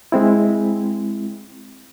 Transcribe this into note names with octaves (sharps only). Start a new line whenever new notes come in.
G#3 C4 E4